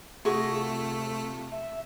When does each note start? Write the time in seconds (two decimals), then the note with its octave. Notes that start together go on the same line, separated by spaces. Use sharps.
0.25 C3 A3 F4 F#4 G#4
1.52 E5